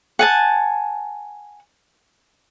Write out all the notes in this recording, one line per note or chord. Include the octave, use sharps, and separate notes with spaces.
F#5 G#5 A5